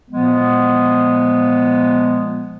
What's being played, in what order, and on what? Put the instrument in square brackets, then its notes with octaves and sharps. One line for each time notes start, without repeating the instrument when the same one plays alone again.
[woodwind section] A#2 F3 G#3 B3